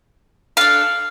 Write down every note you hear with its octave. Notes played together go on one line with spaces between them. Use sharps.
D4 A4 F5